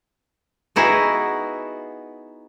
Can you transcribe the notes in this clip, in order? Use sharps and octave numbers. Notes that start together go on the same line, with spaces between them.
B3 D#4 E4 F#4 G#4